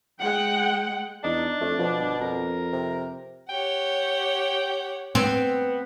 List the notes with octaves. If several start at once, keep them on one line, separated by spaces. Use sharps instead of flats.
G#3 F#5 G5
E2 D4 D#4
F2 A3
B2 F3
G1
F2 A#4
C3
G4 C#5 F#5 G5
B3 C4